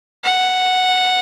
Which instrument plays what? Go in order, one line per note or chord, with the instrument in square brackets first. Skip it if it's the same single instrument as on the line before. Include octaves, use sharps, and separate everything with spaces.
[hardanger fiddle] F#5